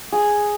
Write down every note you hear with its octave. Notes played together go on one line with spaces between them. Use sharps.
G#4